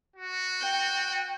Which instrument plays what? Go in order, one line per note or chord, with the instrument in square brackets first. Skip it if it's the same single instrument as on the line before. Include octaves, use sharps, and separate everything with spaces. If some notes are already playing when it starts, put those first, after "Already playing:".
[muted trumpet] F#4
[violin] G5